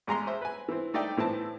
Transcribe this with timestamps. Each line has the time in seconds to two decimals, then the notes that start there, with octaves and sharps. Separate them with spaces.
0.07 A1 G#3 A#5 C6
0.27 C5 E5
0.42 B4 G#5
0.69 E3 C4
0.94 A3 D#4 D5 E5 G5
1.17 A2 E3 C4 A5